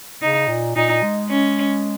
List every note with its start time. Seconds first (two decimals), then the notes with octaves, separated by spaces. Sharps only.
0.21 C#3 D#4
0.48 A#2
0.76 A#2 D#4
1.03 G#3
1.30 C#4